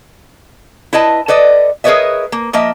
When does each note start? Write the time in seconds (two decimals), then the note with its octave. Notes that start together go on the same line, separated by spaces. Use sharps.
0.93 E4 B4 D#5 A5
1.28 A4 B4 D5 D#5
1.84 G#4 A#4 B4 C#5 D#5 E5
2.32 A#3
2.53 F3 A#3 D#5 E5